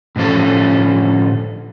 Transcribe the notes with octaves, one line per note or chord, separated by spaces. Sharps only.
A2 D3 F3 C#4 A4